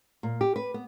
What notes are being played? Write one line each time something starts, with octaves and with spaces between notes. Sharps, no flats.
A#2
G4
B4
B3